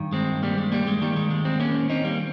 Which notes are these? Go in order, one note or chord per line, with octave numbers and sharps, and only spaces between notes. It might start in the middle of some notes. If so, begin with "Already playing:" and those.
Already playing: G2 D#3
G#3 C4
G3 A#3
G#3
G3 A#3
G#3
D#2 D#3 G3 A#3
G#3
G#3
G#3 C4
A#3 C#4
C4 D#4
G3 A#3